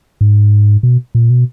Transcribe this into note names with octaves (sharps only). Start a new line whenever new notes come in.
G#2
B2
A#2
B2